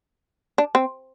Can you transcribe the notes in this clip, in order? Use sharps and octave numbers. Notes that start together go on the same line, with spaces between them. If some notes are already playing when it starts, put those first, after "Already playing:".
D4
C4